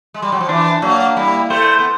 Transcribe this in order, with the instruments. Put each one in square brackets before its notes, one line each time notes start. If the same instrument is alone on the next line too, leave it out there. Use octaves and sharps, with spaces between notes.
[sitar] G#3
G3
F#3
F3
[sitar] E3 [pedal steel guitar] D4
[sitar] F#3 [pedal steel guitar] A#3
[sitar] G3 [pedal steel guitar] E4
[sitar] A3 [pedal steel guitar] C5
[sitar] B3